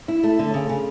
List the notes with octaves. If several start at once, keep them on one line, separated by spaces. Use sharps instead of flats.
E4
A3
D3
C#3
C#3